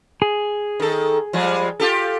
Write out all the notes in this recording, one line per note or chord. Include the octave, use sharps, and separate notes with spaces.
G#4
D#3 A4
F3 G3 G#3
F4 G4 A4